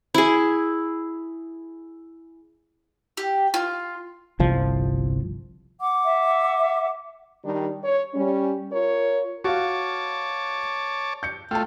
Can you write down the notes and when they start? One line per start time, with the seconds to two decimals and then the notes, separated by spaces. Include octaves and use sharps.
0.14 E4 G#4
3.17 G4
3.54 F4
4.39 G1 C2 F3
5.79 F#5 D6
6.05 E5
7.44 D#3 G3 D4
7.84 C#5
8.14 G3 C#4
8.72 F4 A#4 C#5
9.44 F#4 C#5 F5 A5 D6
11.23 G6 C#7
11.51 A3 F4 G5 A5